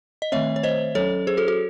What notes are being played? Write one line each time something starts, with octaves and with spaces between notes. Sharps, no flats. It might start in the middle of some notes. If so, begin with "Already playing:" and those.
D#5
D#3 A3 C4 C#5 E5
C#5
C5 D#5
F#3 C#4 A4 C#5
G#4 C5
F#4 A4
F#4 A4